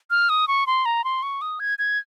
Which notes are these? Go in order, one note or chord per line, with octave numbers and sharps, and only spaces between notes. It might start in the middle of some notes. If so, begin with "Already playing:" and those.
F6
D#6
C#6
C6
A#5
C6
C#6
D#6
G#6
G#6